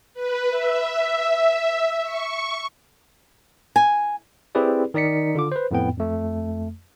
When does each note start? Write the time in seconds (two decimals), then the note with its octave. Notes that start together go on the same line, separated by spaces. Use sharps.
0.14 B4
0.50 E5
2.03 C#6
3.76 G#5
4.55 C4 E4 G4 G#4 B4 D5
4.94 D#3 D#4 D5 B6 C#7
5.35 D3 F4 D6
5.52 B4 C5
5.71 F2 A2 B3 G5
5.97 F2 A3